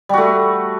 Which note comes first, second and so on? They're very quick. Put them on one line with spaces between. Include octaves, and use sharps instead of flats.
G3 F#4 A3